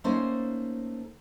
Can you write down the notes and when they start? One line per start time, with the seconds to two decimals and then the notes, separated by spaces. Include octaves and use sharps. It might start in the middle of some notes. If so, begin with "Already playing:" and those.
0.04 A3 A#3 C#4 D#4 A4 C5